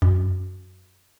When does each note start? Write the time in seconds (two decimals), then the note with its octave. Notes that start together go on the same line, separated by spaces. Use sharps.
0.02 F#2